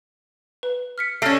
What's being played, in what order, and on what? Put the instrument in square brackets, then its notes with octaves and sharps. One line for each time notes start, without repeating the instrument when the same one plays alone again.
[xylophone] B4
F6 B6 C#7
[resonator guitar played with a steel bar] A3 C#4 [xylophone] F6 A#6 C7